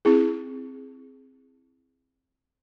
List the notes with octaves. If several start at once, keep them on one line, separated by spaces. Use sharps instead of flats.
C4 E4 G#4